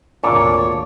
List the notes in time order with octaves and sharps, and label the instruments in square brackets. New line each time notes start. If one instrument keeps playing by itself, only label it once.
[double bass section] G#1 D2 [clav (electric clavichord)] A#2 [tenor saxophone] C#5 [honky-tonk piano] A5 D6